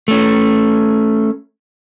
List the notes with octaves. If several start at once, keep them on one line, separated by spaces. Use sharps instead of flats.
A3 C#4